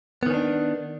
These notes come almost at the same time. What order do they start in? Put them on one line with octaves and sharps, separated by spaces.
B3 D#3 C#4 D4